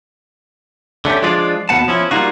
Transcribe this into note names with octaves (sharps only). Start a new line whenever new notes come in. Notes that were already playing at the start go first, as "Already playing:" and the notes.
D3 A3 C#4 G4
F3 G#3 D4 F4 D5
D#2 B2 B3 F#5 A5
F3 C#4 E4
G3 A#3 D#4 F4 F#4